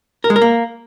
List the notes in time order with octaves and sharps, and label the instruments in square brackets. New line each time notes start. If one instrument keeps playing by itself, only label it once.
[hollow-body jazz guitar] A#4
G#3
A#4
A#3